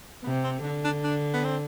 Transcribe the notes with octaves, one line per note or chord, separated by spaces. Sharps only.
C3 B3
C4
D3 D4
D4
D4
B3
C4